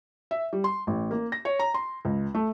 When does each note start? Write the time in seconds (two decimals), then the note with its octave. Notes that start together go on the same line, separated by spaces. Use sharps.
0.31 E5
0.53 G3
0.64 C6
0.87 A1
1.11 A#3
1.32 A#6
1.45 C#5
1.59 A#5
1.74 C6
2.05 C#2
2.35 A3